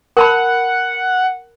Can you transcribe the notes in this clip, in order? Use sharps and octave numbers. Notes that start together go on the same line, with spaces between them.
A#4 F#5 A5 B5